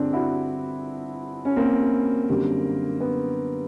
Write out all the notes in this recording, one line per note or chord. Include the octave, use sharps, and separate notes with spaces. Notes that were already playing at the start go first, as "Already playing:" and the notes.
Already playing: G1 G2 D3 C4 D4 G#4
E4 F#4
C#4
A#3 C4
F#2 D3 G3
B3